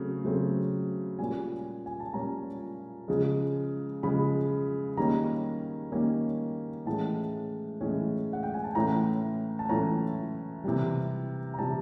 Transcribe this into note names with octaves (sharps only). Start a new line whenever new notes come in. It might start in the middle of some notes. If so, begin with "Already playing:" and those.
Already playing: C#3 F#3 A3 C4
C#3 F#3 A3 C4
A#2 G3 A#3 C#4 G#5
G#5
A5
A#2 G3 A#3 C#4 A#5
C#3 F3 G#3
C#3 F3 G#3 B5
D#3 G3 A#3 C#4 A#5
D#3 G3 A#3 C#4
A2 E3 G#3 C#4 A5
A2 E3 G#3 C#4
F#5
G5
G#5
A5
A2 E3 A3 C#4 A#5
A5
A2 E3 A3 C#4 A#5
C3 E3 G3
A#5
C3 E3 G3 A5